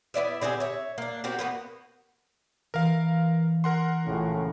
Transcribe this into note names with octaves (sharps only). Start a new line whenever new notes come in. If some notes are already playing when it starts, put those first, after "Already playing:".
B3 E4 D5 E5
D3 C4 G4 G#4
C#5 E5
A#3 D4
C4 F#4 G4 A#4
A#3 B3 F#4
E3 A#4 E5 F5
A#4 F#5 C6
A#1 A2 C#3 F4